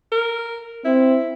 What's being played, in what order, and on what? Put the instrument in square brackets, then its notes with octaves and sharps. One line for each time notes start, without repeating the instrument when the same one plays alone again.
[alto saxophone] A#4
[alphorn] C4 [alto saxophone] E4